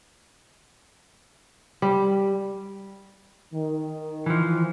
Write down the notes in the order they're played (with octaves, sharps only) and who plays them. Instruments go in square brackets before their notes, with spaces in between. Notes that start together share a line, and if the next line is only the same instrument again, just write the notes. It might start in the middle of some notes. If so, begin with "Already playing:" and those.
[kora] G3
[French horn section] D#3
[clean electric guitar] E3 F3